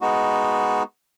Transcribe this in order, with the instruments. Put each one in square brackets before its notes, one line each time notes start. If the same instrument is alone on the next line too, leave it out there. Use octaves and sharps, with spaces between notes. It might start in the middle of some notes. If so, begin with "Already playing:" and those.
[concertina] G#3 B3 D#4 F#4